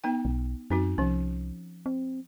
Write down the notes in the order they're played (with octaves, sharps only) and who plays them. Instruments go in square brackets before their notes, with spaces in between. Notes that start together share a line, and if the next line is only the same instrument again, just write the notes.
[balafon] B3 D#4 G5
[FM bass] B1
[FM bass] F#2 [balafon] C4 D#4 F#4
[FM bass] C2 [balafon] F3 C#4
[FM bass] C4